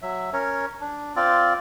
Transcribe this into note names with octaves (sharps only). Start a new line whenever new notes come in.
F#3 E5
C#4 A#4 C#5
D4
C4 F4 D5